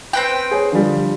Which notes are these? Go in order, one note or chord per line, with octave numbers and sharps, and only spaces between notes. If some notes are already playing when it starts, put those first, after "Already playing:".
C4 B4 G5
G#4 C#5
D3 F3 G3